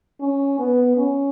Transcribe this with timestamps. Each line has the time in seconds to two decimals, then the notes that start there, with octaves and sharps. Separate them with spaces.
0.21 C#4
0.59 B3
0.97 C#4